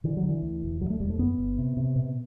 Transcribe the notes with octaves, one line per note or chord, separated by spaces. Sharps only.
D3 E3
F#3
D3
E3
D2
E1
D2 F#3
A3
E1 G3
A3
F#2 B3
G1
C3
C3
B2